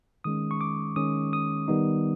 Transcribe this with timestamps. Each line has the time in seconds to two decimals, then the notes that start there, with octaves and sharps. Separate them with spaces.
0.24 D#3 G#3 C#4 D#6
0.51 C#6
0.61 D6
0.96 D#3 G#3 C#4 D#6
1.33 D#6
1.68 D#3 G3 B3 D#4